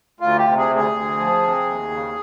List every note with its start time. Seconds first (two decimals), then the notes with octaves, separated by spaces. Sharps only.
0.20 D2 F4
0.38 G4
0.45 C3
0.57 G#4
0.69 D2
0.75 G#4
0.93 D2
1.18 F3
1.42 C3
1.66 D#2
1.91 C#3